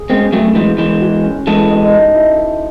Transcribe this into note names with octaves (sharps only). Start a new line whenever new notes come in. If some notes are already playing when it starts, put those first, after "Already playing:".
Already playing: G#4
G#3 C4 C#4
F#3 A3 C#4
E3 G#3 C5
E3 G#3 C5
F#4
C#4
E3 G#3 A4
D#5
D#4
E4
C5